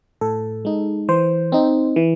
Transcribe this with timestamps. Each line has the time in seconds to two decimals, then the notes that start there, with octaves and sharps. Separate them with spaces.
0.21 A2 A4
0.65 G#3 D#4
1.08 E3 C5
1.52 C4 D#4
1.96 E3